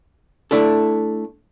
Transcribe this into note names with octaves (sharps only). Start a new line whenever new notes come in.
A3 D4 E4 A4